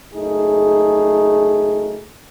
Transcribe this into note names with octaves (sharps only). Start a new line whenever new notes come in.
F#1 A3 D#4 G#4